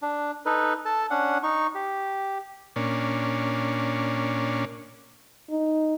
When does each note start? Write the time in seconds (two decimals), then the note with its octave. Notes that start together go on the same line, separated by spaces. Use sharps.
0.02 D4
0.46 D#4 A4 B4
0.85 A4 A5
1.10 C#4 D4 F#5
1.43 D#4 C#6
1.75 G4
2.76 A#2 C#4 D4
5.50 D#4